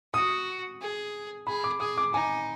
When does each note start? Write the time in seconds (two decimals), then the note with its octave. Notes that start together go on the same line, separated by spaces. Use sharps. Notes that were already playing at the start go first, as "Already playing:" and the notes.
0.14 F#4 D#6
0.81 G#4
1.47 G#4 B5
1.64 D6
1.80 G#4 D#6
1.97 D6
2.14 D#4 G#5